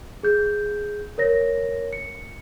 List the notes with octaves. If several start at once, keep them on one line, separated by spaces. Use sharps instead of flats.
G#4 G6
A#4 C#5 A#6
C#7